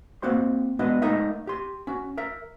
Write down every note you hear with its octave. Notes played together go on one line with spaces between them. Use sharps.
A#3 C4 F#4 C5 C6
G#3 B3 D4 F#4 B4 D#5
G#3 A3 D#4 A#4 D#5 E5
G4 C6
C#4 F#4
A#4 E5